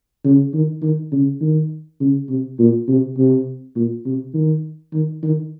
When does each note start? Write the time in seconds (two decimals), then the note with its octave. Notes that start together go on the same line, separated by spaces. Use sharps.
0.24 C#3
0.54 D#3
0.82 D#3
1.12 C#3
1.41 D#3
2.00 C#3
2.29 C3
2.59 A#2
2.88 C3
3.18 C3
3.76 A#2
4.05 C3
4.34 D#3
4.93 D#3
5.23 D#3